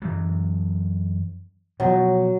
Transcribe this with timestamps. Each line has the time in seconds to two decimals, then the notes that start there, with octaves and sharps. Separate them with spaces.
0.02 F#2 E3 F#3
1.80 B2 F3 F#3